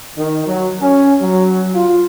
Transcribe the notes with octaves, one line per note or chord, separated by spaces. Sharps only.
D#3
F#3
C#4
F#3
F4